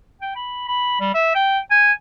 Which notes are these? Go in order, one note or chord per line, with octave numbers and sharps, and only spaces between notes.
G5
B5
B5
G3
E5
G5
G#5